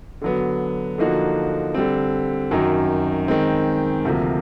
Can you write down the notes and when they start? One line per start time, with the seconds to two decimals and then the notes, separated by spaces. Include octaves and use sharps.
0.21 D3 F#3 B3
0.98 D3 F3 A#3 D#4 F#4
1.74 D3 G3 C4
2.51 F#2 D#3 F#3
3.28 D#3 G#3 C4
4.05 D2 C3 F3 A#3